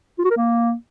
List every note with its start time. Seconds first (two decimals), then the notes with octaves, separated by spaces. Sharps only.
0.19 F4
0.25 F#4
0.31 A#4
0.37 A#3